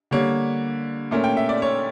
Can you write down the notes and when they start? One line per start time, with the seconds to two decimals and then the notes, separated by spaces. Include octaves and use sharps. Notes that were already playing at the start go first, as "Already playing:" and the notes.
0.11 D3 G3 A#3 C#5
1.11 A#2 A3 C#4 A#4
1.24 G5
1.37 E5
1.49 D5
1.62 C#5